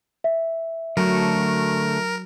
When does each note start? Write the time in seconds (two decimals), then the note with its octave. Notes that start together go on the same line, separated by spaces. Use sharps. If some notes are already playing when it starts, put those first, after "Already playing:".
0.24 E5
0.97 D3 F#3 A3 F#4 A#4